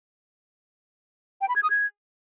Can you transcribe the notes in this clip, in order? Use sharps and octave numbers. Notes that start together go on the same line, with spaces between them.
G5
B5
G#6
D#6
G#6